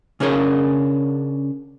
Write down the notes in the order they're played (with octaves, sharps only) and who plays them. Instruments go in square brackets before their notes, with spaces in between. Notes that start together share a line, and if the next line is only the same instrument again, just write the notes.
[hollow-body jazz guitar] C#3 C#4 D4 G#4 A#4 C#5